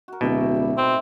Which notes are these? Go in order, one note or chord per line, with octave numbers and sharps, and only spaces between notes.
F#4 A#4
D1 B2 G4 E5 G5
G3
A2 D#3 C4 E4